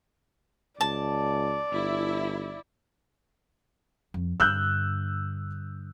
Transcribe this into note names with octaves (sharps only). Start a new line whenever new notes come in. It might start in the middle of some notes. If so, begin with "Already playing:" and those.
C#2 D5 A5
G1 E4
F2
G2 D3 E6 F#6 G6